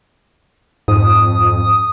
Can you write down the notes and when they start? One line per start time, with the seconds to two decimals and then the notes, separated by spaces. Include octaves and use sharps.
0.88 F2 G#2 D#6